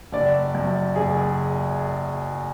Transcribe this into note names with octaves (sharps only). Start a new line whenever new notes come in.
F#1 D5
F#2
F#1 G#4